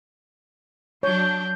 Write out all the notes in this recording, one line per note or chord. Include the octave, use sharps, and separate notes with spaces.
F#3 D4 C#5 G6